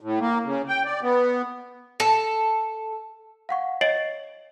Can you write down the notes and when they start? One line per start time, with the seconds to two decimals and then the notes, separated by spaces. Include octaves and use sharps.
0.01 A2
0.20 A#3
0.45 C#3
0.68 G5
0.85 D5
1.02 B3
2.00 A4
3.49 F5 F#5 C#6
3.81 C#5 D#5 A6 C7 D7 F#7